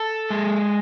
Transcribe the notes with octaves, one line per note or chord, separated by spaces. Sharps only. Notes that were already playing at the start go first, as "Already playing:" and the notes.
Already playing: A4
G#3